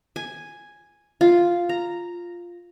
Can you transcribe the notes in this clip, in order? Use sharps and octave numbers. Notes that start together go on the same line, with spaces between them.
G#5
F4
A#5